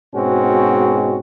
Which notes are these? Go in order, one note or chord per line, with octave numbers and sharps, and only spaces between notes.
G#2 B2 G#3 C4 C#4 F#4